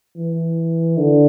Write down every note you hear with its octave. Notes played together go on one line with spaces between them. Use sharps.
E3
D3